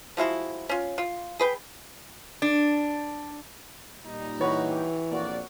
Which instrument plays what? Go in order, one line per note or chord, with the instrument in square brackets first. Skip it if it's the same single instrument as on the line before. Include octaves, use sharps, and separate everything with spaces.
[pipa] F3 G#3 E4 F#4
C#4 F4
F4
G#4 B4 G5
[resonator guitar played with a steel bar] D4
[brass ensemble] A#2 G3 D#4
[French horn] E3 [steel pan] F#4 B4 [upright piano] C#5
[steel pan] G4
[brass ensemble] A#1 F2 D5 [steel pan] A#3 F#4